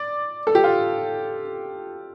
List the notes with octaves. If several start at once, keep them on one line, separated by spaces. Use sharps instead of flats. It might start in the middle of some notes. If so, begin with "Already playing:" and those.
Already playing: D5
A4
G4
F4